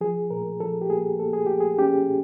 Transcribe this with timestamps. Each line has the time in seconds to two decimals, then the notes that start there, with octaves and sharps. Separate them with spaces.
0.01 F3 G#4
0.30 A#2 A#4
0.60 F3 A4
0.82 G4
0.90 A#3 G#4
1.19 A#3 A4
1.33 G#4
1.46 F3 G4
1.60 G#4
1.78 C#4 G4
2.08 A#2